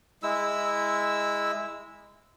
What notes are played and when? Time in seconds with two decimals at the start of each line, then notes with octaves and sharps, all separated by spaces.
0.23 G#3 E4 E6